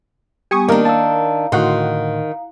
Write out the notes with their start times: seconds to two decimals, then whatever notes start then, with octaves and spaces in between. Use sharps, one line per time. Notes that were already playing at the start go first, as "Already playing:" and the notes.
0.51 G3 B3 G4 G#5 C#6 D#6
0.69 D#3 A#3 D4 A#4
0.85 F5 A5 A#5 E6
1.52 A2 D3 D#3 F#4 F#5 C6